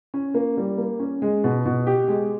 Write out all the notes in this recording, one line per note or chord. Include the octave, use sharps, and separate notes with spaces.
C#4
A#3
G3
A#3
C#4
G#3
B2
B2
G4
G#3